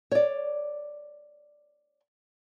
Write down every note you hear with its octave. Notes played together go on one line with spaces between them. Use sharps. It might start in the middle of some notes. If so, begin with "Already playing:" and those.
C#5 D5